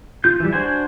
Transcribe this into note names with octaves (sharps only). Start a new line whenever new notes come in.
F4 G6
E3 G3
D4 F#4 C5 G#5